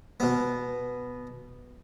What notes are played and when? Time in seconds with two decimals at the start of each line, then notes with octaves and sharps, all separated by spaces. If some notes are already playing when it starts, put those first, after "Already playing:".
0.20 B2 B3